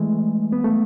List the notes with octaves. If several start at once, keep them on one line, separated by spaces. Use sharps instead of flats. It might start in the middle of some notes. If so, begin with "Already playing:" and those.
Already playing: E3 G#3 A3
B3
A3